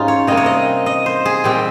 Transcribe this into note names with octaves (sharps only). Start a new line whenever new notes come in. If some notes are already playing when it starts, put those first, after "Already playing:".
Already playing: G#2 G#3 C#4 D#4 F4 G4
C#5
C3 G3 A#3 D#5
C#5
D#5
D#5
C5
G#4
A#2 G3 C4 G4